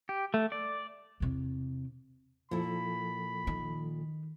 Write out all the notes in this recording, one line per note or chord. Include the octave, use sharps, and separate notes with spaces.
G4
A3
D5
E2 C3
A#2 F3 E4 A4 B5
D#3